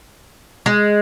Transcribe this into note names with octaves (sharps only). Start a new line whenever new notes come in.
G#3